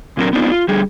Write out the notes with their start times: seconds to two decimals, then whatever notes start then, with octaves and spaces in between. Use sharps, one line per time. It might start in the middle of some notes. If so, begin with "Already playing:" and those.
0.17 A#2 F#3 C4 D4 A#4
0.33 B3 C4 D4 D#4 F4
0.51 F4
0.68 D3 G3 G#4